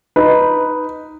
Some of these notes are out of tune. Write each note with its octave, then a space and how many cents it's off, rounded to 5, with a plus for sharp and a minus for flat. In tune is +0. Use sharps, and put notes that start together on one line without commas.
D#4 +0 B4 +0